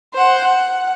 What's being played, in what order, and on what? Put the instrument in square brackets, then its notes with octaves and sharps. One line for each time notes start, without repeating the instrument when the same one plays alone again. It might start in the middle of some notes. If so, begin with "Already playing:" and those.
[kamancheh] C5 F#5
F#5